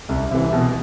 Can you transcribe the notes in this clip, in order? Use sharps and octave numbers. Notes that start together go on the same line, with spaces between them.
C2
C3 E3
B2